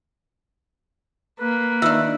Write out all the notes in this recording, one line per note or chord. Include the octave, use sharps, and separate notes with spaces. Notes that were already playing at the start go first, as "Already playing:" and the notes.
A#3 B4
D#3 D4 F4 E5 E6